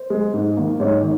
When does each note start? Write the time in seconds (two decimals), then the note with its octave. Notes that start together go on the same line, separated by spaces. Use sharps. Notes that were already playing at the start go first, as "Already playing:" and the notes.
Already playing: C5
0.10 G#3
0.34 G#2
0.57 D#3 A#3
0.80 G#2 C#5
1.03 D#3